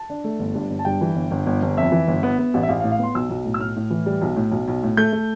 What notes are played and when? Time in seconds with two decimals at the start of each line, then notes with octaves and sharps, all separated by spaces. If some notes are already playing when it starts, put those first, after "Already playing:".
Already playing: A5
0.10 D4
0.24 A3
0.39 G1
0.55 G2
0.70 G1
0.79 A5
0.85 G2 G5
1.01 E3
1.15 G1
1.31 G1
1.46 G1
1.62 G1
1.77 F2 E5
1.92 E3
2.07 G1
2.23 B3
2.39 B3
2.54 A1
2.63 E5
2.68 A1 F5
2.80 F5
2.84 A2
2.91 F5
2.99 B3 C6
3.15 B1 E6
3.30 B1
3.45 A2
3.54 E6
3.60 A2 F6
3.76 A2
3.90 E3
4.06 G3
4.22 B1
4.36 A2
4.51 B1
4.68 B1
4.83 A2
4.97 A3 G6
5.13 A3